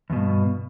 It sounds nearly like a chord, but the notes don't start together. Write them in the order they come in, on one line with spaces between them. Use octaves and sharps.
E2 B2 G2